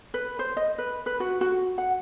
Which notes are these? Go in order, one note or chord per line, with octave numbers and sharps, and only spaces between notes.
B4
C5
D#5
B4
B4
F#4
F#4
F#5